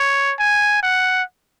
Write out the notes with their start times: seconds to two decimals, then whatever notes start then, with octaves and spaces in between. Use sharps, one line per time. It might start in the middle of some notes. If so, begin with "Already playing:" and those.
Already playing: C#5
0.39 G#5
0.83 F#5